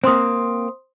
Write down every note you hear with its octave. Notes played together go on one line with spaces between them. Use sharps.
A#3 C4 C5 C6 D#6